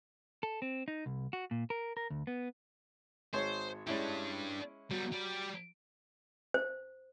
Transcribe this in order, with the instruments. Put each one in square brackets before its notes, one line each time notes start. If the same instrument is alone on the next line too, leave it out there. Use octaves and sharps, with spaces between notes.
[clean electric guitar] A4
C4
D#4
C2
F#4
A#2
A#4
A#4
D2
B3
[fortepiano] G#1 G#3 C#5 [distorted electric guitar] C5
[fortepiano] G#3 C#4 E4 [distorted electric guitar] D4 G4
[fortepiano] F#3 [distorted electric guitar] G3 B3
[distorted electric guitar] G3 D5
[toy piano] C5